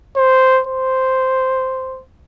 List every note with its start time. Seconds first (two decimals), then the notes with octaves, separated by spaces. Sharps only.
0.16 C5
0.67 C5